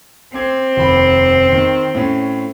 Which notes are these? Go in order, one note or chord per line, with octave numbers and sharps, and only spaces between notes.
C4 D6 G#6
F1 D#2 B5
D#3
A2 C#4